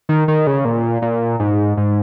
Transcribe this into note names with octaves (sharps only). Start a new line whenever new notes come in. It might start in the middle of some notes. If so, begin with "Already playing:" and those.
D#3
D#3
C#3
A#2
A#2
G#2
G#2